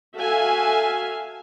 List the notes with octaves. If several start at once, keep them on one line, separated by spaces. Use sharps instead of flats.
F#4 A4 E5 F5 G#5